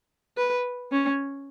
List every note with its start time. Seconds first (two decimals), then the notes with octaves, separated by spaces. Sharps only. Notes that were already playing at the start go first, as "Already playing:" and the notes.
0.37 B4
0.92 C#4